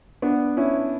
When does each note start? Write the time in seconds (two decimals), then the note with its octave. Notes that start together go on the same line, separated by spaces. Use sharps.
0.22 B3 D4
0.57 C#4 E4